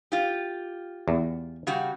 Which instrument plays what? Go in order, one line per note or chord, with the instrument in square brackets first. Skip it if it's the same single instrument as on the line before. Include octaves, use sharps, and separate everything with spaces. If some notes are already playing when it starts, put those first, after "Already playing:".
[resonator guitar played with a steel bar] F4 G4
[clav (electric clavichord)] E2
[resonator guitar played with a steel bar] C#3 G3 F#4